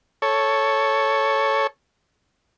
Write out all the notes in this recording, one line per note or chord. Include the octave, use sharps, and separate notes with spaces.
A4 C#5